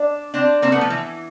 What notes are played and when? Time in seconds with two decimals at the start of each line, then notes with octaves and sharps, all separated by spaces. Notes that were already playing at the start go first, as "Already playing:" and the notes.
Already playing: D4
0.34 C4 D4
0.62 A#3 C4
0.72 A3 B3
0.81 F3
0.90 E3